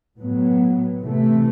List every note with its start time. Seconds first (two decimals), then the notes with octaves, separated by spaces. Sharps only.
0.17 A2 F#3 B3
0.99 C3 E3 A3